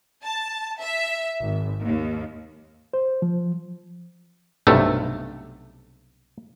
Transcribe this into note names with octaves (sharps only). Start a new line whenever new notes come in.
A5
E5
G#1
D#2
C5
F3
B1 G2 C3 A3